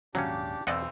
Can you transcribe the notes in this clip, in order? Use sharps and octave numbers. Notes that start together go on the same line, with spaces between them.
D#1 D#2 G#2 C#3 F#3 C#4 D4 G4
B1 E2 C4 D5 D#5 F#5 E6